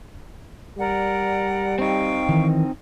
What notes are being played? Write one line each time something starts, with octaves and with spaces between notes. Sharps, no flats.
G3 A#4 D5 F#5
C4 D#4 F5 G5 C#6
D#3 E3